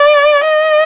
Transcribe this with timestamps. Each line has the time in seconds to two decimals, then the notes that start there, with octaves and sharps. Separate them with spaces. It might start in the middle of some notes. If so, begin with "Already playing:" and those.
Already playing: D5
0.44 D#5